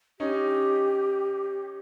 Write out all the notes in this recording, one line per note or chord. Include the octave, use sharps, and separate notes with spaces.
C#4 D#4 G4